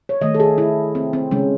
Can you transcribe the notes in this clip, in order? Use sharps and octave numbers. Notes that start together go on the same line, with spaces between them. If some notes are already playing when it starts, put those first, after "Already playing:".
C#5
D#3 A3 D#5
A4
G#4
E4
C4
C4
C#3 G#3 C#4